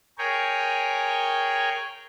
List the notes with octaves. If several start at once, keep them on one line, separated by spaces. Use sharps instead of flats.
G#4 A#4 C#5 G5 G#5